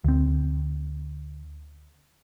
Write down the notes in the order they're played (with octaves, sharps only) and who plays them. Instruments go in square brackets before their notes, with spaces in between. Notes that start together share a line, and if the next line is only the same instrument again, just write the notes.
[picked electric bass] D2 C4